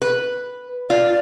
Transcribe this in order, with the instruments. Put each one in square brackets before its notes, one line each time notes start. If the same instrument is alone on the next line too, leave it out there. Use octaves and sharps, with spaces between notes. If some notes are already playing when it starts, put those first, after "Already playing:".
[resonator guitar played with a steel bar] B4
[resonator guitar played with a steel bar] F4 [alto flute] D5